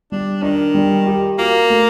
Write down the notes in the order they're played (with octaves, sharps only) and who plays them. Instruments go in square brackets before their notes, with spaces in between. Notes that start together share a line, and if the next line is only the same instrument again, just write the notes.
[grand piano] G3 [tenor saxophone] D4
[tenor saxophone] D#3 [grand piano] D4
[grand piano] G3
G4
[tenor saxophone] A#3 [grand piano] F#4
[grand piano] A3